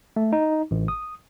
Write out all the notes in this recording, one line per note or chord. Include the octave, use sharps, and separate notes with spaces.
A3
D#4
A1
D#6